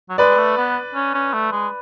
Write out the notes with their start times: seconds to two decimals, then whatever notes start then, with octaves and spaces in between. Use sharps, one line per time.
0.09 F#3
0.18 G#3 B4 D5
0.38 A3
0.57 B3
0.95 C#4
1.14 C#4
1.33 A3
1.52 G#3